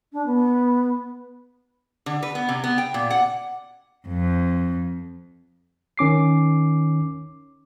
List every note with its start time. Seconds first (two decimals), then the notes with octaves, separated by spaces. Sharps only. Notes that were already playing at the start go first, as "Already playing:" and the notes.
0.13 D4
0.26 B3
2.06 D3
2.23 B4
2.35 B3
2.49 C3
2.64 B3
2.78 G5
2.94 A#2
3.10 F#5
4.08 F2
5.98 D#3 C#4 D6 C7